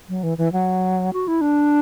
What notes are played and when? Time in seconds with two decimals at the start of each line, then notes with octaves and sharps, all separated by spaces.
0.09 F#3
0.23 E3
0.38 E3
0.53 F#3
1.13 F#4
1.28 E4
1.41 D4